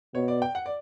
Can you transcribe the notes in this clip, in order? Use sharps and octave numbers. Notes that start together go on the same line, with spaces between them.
B2 C#5
D5
G5
F#5
D5